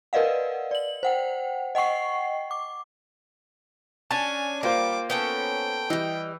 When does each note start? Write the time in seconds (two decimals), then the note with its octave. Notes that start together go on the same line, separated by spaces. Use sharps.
0.13 A#4 B4 D5 D#5 F5 F#5
0.71 D5 F#7
1.03 C5 F#5 G5
1.75 D#5 F#5 G5 C#6 C7
2.51 D6
4.11 C#4 D4 G#5 A5
4.63 G3 A#3 F4 C5 D6
5.10 B3 C#4 A4 G5
5.90 E3 G3 D#5